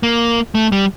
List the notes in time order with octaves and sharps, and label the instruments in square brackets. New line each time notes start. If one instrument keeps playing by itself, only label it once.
[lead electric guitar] A#3
A3
G3